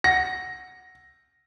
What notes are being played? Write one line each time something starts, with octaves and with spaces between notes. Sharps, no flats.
F#5 A#6